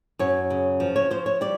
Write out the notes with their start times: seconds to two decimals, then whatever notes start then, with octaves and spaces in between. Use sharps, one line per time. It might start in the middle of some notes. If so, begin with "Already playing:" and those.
0.19 F#2 C#5
0.50 C#3
0.80 F3
0.96 C#5
1.11 F3 C5
1.26 C#5
1.41 G3 D5